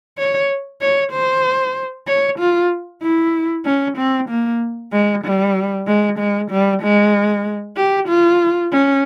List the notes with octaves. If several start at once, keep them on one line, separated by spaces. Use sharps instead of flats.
C#5
C#5
C5
C#5
F4
E4
C#4
C4
A#3
G#3
G3
G#3
G#3
G3
G#3
G4
F4
C#4